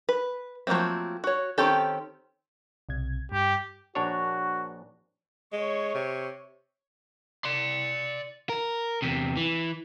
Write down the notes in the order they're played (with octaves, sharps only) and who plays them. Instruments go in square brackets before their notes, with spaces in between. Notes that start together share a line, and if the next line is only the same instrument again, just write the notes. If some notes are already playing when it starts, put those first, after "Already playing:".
[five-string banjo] B4
F3 F#3 A3 A#3 C4
F#4 C#5
D#3 C4 C#4 G4 A4
[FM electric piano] B1 C3 G#6
[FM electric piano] G2 [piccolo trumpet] G4
[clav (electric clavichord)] A#1 D4 C#5 [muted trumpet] F#4
[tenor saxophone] G#3 [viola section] C#5
[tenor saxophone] C3
[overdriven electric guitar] D5 C6
A#4
E2 C3
E3